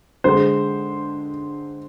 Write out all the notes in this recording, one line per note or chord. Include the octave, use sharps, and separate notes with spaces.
D3 G#3 C5